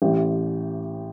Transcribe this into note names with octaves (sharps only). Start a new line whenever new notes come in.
A1 A2 E3 G4